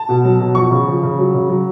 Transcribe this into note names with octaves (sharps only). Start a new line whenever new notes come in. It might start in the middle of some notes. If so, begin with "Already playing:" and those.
Already playing: A5
B2
F#3
B2
F3 C#6
C#3
F3
C#3
F#3
C#3
F#3